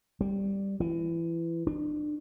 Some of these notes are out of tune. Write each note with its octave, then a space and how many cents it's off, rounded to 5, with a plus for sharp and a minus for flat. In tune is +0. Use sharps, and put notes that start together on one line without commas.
G3 +5
E3 +20
D4 +35